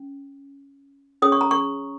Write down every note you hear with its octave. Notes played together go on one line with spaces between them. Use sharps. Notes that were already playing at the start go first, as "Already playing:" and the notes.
Already playing: C#4
C#4 G#4 C#5 D#6
C#6
A#5
C#6